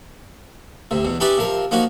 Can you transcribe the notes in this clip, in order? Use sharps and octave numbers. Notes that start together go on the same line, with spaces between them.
D2 C3
E2 B2
C#4 D#4 G4 B4 D5 E5
C3 F3 A#4
F3 A#3 C#4 D#4 F#4